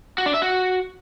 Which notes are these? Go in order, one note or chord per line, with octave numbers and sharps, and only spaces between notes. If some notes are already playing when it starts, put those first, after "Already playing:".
F#4
D4
E5
F#4